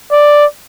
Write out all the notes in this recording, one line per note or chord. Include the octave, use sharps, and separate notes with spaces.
D5